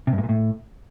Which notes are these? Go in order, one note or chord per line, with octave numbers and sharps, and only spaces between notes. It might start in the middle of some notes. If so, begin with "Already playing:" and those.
C3
G2
A2
A#2
A2